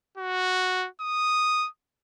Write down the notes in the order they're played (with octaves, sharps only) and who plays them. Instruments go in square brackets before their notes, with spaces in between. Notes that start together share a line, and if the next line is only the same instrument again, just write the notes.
[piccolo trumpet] F#4
D#6